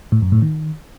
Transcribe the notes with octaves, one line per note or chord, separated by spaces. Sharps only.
A2
F#2
A2
D#3